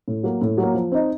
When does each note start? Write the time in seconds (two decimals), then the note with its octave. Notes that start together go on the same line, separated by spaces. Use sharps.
0.08 A2
0.23 F#3 A#3
0.42 A2
0.58 F#3
0.63 A#3
0.74 F3
0.92 C4 D#4